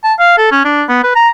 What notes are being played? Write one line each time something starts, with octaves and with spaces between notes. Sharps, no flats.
A5
F5
A4
C#4
D4
B3
B4
A#5